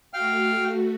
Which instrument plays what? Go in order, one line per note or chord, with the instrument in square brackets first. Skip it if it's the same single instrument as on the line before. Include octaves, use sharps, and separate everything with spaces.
[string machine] A3 F#4 [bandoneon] F5 G5 F6